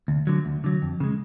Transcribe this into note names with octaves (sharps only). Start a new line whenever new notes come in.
D2
D3 F#3
D2
D3 F#3
F2
C#3 G#3